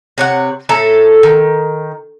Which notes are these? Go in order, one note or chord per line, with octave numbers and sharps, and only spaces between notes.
C3 C#5 F#5
A2 A4 E5 A#5
D#3